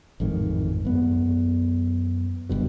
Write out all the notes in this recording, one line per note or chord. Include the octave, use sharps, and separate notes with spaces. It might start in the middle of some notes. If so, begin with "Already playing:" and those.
A1 F2 G#2 D#3
F#2 B3
F#1 G2 B2